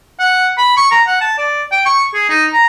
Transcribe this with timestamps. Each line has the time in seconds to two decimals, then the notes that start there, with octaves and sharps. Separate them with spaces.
0.19 F#5
0.57 B5
0.77 C#6
0.91 A#5
1.07 F#5
1.21 A5
1.38 D5
1.71 G5
1.86 C#6
2.14 G#4
2.29 D#4
2.53 A#5